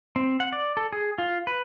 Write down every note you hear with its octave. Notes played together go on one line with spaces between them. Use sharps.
C4
F#5
D5
A4
G#4
F4
B4